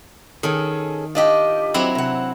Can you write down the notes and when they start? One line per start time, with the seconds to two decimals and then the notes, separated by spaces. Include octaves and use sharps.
0.43 D#3 C#4 G#4 A4
1.15 D4 F4 G4 D#5
1.74 F#3 C4 E4
1.95 C3 F#5